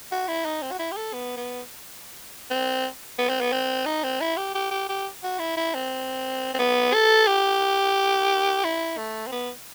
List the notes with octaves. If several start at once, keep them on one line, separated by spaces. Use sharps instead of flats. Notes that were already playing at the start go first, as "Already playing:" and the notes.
F#4
E4
D#4
C4
F#4
E4
G4
A4
B3
B3
C4
B3
C4
B3
C4
D#4
C4
E4
G4
G4
G4
G4
F#4
E4
E4
C4
C4
B3
A4
G4
E4
A3
C4
B3